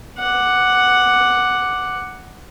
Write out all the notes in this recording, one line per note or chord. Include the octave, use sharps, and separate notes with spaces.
F#5 D6